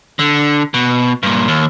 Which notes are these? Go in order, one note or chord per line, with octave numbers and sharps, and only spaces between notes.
D3
B2
G2 A#2
D#2